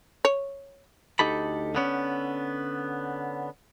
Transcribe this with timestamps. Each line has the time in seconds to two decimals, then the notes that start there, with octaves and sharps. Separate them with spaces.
0.25 C#5
1.19 D2 D#4 G4 A4 B5
1.75 D3 B3 C#4